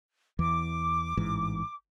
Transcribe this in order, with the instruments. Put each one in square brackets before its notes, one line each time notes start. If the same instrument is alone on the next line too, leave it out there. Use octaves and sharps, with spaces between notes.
[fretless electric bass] E2 E3 [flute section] D6
[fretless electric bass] A1 G#2 E3